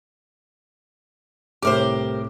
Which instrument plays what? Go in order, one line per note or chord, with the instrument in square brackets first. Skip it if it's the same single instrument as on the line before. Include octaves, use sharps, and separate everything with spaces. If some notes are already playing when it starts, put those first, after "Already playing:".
[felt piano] C2 A2 D6 [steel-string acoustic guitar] G4 A#4 C5